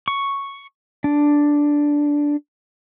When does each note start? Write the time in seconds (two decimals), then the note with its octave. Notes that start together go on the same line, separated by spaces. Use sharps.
0.08 C#6
1.04 D4